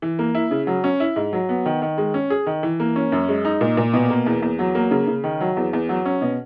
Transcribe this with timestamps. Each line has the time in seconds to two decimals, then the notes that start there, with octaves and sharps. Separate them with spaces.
0.02 E3
0.19 A#3
0.35 E4
0.51 C#3
0.67 F#3
0.84 C#4
1.00 E4
1.16 G#2
1.33 F#3
1.49 B3
1.66 D#3
1.82 D#3
1.98 G#3
2.14 C#4
2.30 G#4
2.46 D#3
2.63 E3
2.80 A#3
2.96 C#4
3.12 F#2
3.29 G#3
3.45 D#4
3.61 A#2
3.77 A#2
3.93 B2
4.10 A#3
4.26 E2
4.42 E2
4.59 F#3
4.75 A#3
4.91 C#3
5.07 C#3
5.24 D#3
5.41 F#3
5.57 E2
5.73 E2
5.89 F#3
6.05 C#4
6.21 B2